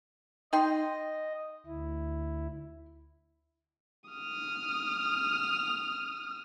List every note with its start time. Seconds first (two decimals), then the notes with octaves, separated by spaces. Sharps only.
0.53 D#4 D#5 G5 C6
1.67 D2 E4
4.10 D#6 F6